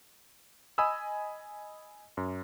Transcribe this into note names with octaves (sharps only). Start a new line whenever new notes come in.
D#5 G#5 B5 D#6 E6
F#2